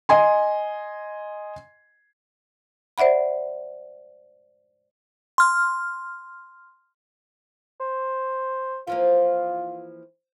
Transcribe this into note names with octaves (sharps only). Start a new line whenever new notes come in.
D#5 G#5 C6
C5 D5 E5 F#5 B5
C6 F6
C5
E3 F3 A#3 F4